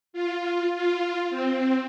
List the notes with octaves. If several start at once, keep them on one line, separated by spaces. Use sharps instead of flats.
F4
F4
C4